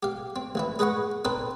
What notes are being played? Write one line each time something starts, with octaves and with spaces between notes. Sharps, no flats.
G4 F5
C4
A1 E3 E4
G#4 B4 D#5 F#5 C#6
C4 D#4 A4 B4 C5